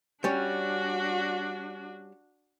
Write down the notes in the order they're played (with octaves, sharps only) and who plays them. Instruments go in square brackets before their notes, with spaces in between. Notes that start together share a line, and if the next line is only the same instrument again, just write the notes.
[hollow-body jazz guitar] G3 C#4 [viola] D4 F#4